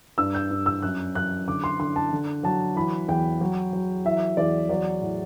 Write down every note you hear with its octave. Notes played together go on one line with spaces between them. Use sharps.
G2 E6
G6
G2
E6
F#2 F#6
F#2 F#6
D3 D6
C6
D3 C6
A5
D3
F#3 A5
E3 B5
E2 G5
F#3
F#3
E3 E5
E2 D5
F#3 D5
A2